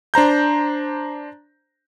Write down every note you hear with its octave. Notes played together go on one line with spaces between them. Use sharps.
D4 C5 A#5 G6